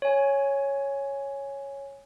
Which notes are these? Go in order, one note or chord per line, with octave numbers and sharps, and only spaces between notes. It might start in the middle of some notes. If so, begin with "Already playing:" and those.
C#5 G#5